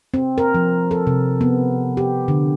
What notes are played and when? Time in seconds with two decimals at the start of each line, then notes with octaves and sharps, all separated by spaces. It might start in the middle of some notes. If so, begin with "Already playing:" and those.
0.14 C4
0.38 A#4
0.54 F3
0.91 A4
1.07 C3
1.41 B3
1.97 G4
2.28 D3